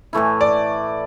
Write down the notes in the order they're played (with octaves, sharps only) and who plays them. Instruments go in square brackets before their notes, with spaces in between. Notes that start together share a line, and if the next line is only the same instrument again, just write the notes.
[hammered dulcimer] A2 E3 A3 E4
[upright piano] D5